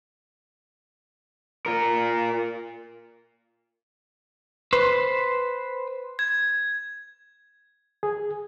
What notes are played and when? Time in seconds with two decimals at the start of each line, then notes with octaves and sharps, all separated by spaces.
1.66 F4 A#4
4.73 B4 C5
6.19 G#6
8.03 G#4